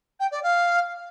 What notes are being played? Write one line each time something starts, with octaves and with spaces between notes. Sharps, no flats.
G5
D5
F5